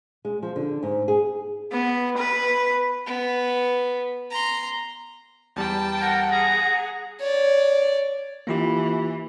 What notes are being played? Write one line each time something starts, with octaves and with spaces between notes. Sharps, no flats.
G#3
F3
D3
G#2
G#4
B3
B4
B3
A#5 C6
E2 G3 G5 A5
A#4 F#5
G#4 A#5
C#5 D5
E3 A#3 F4 G4